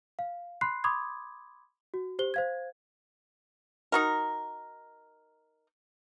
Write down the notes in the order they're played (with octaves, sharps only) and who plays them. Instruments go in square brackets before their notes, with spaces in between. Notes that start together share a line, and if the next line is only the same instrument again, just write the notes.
[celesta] F5
B5 C6 F#6 C7
B5 C6 D6 D#6 G#6
F#4
G4 C5 G7
C5 F5 G#6
[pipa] D#4 F#4 A#4